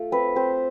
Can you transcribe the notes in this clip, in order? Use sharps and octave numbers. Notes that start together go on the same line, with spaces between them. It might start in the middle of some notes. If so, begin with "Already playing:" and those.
Already playing: A3 F4
C4 B4
C4 C5